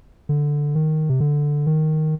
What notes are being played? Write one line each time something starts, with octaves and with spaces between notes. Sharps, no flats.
D3
D#3
C3
D3
D#3